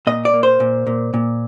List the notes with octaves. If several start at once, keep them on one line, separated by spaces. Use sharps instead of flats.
A#2 D#5
D5
A#3
C5
A#2
A#2
A#2